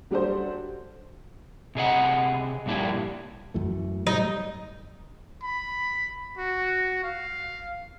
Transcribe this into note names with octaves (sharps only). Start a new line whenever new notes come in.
F#3 G3 D4 F#4 A4 C5
C3 G#4 D#5 F#5
G2 A#2 A#3 D4 E4 G4
F#2 E3 A3
A2 F#3 G3 D#4
B5
F#4
F5